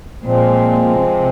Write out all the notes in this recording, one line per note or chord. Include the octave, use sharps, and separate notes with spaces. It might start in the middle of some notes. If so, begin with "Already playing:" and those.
A#2 F3 G#3 C4
C3